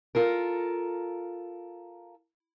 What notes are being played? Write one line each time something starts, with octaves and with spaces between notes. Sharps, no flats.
F4 A4 A#4